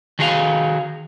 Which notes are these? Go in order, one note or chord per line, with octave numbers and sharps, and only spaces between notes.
D#3 F#4 G#4 F5